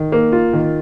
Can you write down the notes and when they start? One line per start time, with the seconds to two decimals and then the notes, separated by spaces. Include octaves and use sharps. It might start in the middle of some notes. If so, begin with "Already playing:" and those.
Already playing: D#3
0.12 A#3
0.33 F4
0.53 D#3